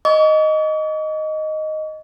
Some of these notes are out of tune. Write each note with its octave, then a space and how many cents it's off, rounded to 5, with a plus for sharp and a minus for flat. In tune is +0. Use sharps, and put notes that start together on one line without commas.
D#5 +0 C#6 +45